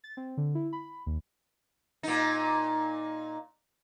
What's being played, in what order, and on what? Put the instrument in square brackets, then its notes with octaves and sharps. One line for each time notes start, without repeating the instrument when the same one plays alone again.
[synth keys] A6
C4
D3
E4
B5
D#2
[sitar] A#2 D#4